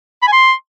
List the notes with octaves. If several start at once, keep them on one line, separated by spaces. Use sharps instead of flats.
B5
G#5
C6